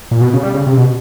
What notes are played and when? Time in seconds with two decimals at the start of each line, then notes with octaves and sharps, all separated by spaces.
0.11 A#2
0.21 B2
0.33 C#3
0.43 G3
0.54 C#3
0.67 C3
0.77 B2